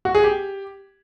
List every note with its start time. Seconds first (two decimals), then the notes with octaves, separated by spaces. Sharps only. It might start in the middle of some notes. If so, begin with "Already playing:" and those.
0.05 F#4
0.15 G#4
0.24 G4